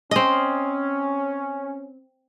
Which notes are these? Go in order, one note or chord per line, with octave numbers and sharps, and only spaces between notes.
C4 C#4 D#5